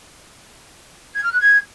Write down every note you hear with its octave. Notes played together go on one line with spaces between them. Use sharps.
G#6
F6
F#6
G#6